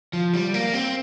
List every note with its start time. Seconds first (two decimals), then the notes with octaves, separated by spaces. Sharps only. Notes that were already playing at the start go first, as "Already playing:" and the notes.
0.13 F3
0.34 G3
0.54 A#3
0.74 C4